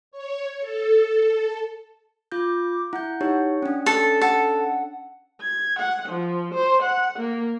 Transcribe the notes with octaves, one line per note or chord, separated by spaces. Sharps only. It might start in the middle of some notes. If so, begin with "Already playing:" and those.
C#5
A4
F4 D6 G6
E4 F#5 G6
D#4 G4 C#5
C#4 D4
A4
A4 F#5
G#6
F#5
F3
C5
F#5
A#3